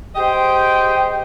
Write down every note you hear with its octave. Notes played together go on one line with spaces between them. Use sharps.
G4 G#4 C5 D#5 G5